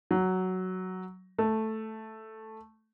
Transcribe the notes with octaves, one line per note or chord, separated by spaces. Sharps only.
F#3
A3